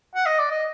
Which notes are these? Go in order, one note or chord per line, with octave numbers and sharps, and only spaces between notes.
F#5
D#5
D5
D#5